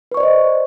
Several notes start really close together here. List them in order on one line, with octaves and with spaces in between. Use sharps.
B4 C#6 D5 C5 D#5